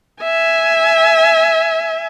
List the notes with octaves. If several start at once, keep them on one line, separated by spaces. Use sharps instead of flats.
E5 G#5